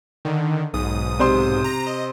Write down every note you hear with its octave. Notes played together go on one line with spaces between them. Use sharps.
D3 D#3
B1 G#2 D#6
C3 C5 C6
A#5
D#5